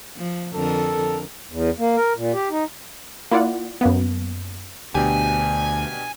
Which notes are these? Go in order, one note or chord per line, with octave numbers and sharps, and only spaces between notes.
F3
F2 D3 A4 A#4
E2
A#3
A#4
A#2
G4
D#4
A#3 E4 F4 D5 F#5
F#2 A#3 B3
D2 B2 D4 G4 G#5